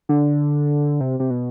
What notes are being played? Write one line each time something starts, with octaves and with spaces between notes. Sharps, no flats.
D3
C3
C3
B2